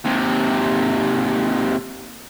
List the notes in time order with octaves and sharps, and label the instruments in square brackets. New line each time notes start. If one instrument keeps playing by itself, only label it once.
[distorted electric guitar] D#2 C3